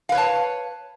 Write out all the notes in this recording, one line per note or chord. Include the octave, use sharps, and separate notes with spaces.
B4 C#5 F5 A5